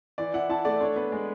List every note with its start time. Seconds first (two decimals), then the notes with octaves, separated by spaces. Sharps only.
0.18 E3 D5
0.34 E4 F#5
0.49 E4 A5
0.65 A3 D5
0.80 D4 C#5
0.96 B3 B4
1.12 G#3 D5